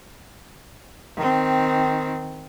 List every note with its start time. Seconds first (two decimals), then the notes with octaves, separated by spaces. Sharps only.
1.16 D#3 C4